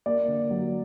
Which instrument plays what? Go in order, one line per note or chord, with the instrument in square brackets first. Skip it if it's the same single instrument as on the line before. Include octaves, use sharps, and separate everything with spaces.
[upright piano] A#3 D5
D3
F#3